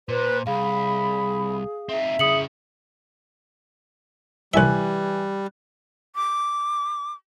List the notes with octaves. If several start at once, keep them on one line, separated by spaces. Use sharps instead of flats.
A#2 B4 C5
C2 G#4 F5 B5
C4 D#4 E5
C#3 E4 G#4 D#6 C#7 F#7
C2 E3 G3 E5 G#5 F#6
D6